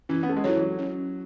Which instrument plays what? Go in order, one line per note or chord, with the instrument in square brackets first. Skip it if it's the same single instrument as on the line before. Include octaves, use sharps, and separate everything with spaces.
[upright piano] E3 [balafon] C#4
[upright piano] B3
A3
G#3
[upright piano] F#3 [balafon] E4 A4 C#5
[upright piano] E3
F#3
[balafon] C#4